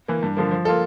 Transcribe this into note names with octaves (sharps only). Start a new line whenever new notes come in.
E3 A#3
G2
D3 F3 A#3
F3
A#3 F4 A4